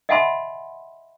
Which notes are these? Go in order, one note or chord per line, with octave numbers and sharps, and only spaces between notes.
D#5 E5 F#5 G#5 B5 C6